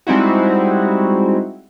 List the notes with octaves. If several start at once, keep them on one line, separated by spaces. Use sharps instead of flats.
G3 G#3 C4 D#4 E4 F#4